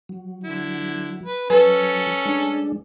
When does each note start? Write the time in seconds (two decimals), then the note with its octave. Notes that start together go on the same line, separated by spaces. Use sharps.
0.09 F#3
0.44 D3 E4
1.25 B4
1.50 F#3 C#4 A4 B4 G#5
2.26 G#3 D4